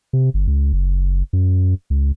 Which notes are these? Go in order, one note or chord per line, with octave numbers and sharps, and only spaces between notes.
C3
G1
C#2
F#1
F#2
C#2